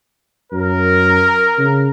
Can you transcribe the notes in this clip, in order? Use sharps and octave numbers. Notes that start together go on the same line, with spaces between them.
F#2 A#4
C#3